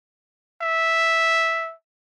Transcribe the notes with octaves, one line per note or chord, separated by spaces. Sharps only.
E5